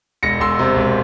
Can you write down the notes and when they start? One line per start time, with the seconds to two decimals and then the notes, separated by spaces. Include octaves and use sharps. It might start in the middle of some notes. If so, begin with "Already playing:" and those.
0.23 E1 A#6 C#7
0.40 E1 C6 E6
0.59 C3
0.76 E1